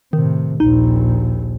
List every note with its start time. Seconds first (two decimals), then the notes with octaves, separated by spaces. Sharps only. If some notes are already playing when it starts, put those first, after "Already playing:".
0.13 A2 C3 D#3
0.60 A#1 D#2 D#4